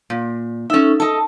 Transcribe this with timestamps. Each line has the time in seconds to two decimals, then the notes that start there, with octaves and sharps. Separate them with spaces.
0.10 A#2
0.70 C#4 D#4 A4 E5
1.00 A4 D#5 A5